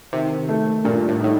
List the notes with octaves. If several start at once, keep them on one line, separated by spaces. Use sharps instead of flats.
C3 D#3
A3
G2 A#2
A2
A2 D#4